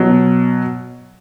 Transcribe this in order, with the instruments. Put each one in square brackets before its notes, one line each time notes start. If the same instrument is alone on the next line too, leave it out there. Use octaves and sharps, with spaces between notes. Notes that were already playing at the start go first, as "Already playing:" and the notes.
Already playing: [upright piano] B2 F#3